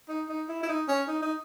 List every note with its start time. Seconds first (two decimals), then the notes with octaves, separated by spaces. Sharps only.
0.09 D#4
0.29 D#4
0.49 E4
0.63 E4
0.69 D#4
0.88 C#4
1.08 D#4
1.22 D#4